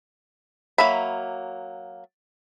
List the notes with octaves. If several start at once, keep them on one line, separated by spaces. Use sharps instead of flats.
F#3 A#3 E5 B5